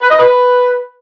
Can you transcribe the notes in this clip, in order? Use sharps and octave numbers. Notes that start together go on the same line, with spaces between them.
B4
D#5
B4